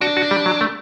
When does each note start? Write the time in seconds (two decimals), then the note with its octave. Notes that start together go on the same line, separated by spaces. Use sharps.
0.01 D4 F#4
0.17 F#4
0.31 G3
0.46 F#3
0.61 A3